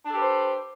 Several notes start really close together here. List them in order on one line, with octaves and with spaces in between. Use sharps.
D4 A4 G4 B4 C5